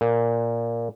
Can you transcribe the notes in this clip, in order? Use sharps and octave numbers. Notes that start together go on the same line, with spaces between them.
A#2